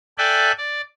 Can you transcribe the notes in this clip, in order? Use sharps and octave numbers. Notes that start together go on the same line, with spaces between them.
A4 D5 E5 G5 G#5 F#6
D5